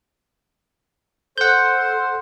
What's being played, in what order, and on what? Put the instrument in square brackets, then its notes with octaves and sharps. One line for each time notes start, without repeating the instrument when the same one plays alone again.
[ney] A4 [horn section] C5 [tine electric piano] F#5 G6